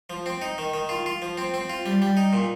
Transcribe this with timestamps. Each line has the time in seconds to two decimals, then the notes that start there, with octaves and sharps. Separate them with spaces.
0.10 F3
0.26 C4
0.42 D#4
0.58 D#3
0.74 D#3
0.89 F4
1.06 F4
1.22 F3
1.38 C4
1.54 C4
1.70 F4
1.86 G3
2.02 G3
2.17 D#4
2.33 A#2